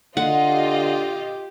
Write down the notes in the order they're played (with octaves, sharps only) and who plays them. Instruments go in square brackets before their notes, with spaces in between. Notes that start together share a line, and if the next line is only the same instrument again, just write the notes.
[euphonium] D3 [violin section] F4 D#5 [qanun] F#5
[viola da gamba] G4